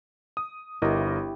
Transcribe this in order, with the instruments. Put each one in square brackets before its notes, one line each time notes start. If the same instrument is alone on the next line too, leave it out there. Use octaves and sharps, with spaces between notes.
[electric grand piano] D#6
[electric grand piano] G1 A#4 D#5 [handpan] E4 G4